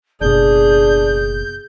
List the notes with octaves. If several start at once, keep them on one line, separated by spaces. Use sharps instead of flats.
F#1 B2 D4 G#4 G6